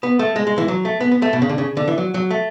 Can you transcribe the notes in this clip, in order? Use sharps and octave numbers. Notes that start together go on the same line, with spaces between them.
B3
A3
G#3
G#3
E3
F#3
A3
B3
B3
A3
B2
C#3
D3
C#3
D3
E3
F#3
F#3
A3